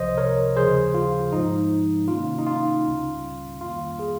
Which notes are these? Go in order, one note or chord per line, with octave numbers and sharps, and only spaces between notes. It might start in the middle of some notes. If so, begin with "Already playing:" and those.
Already playing: C2 C3 F3 C5 D#5
A#4 C#5
D#2 C#3 F3 G#4 C5
F4
G#2 F3 G#3 D#4
C3 D#3 A#3 C#4 F4
D#4
F4
C#2 C#3 G3 C#4
F2 D#3 G3 A#3 F4
F4 G#4